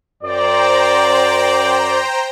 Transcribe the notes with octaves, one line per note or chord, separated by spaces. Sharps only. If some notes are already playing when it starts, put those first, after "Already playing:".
F#2 C5 D5 G5 A#5